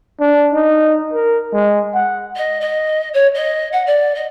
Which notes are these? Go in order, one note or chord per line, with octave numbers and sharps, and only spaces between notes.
D4
D#4
A#4
G#3
F#5
D#5
D#5
C#5
D#5
F#5
D5
D#5